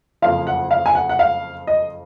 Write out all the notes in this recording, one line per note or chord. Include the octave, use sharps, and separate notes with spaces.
F#1 F2 F3 F5
F#5
F5
G#5
F#5
F#5
F5
D#5